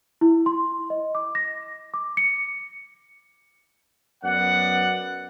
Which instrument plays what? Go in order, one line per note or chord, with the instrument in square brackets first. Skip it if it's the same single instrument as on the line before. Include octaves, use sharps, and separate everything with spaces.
[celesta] E4
C6
D#5
D6
A#6
D6
C#7
[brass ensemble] F#2 B3 D5 F#5